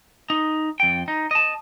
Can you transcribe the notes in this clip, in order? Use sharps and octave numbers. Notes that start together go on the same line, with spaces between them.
D#4
F2 G5
D#4
D#5 A5